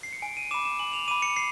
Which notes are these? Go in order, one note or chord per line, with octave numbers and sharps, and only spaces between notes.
C7
C#7
G#5 D7
D#7
B5 D6 E7
E7
G#5 F#7
F7
B5 D6 D#7
C#7
C7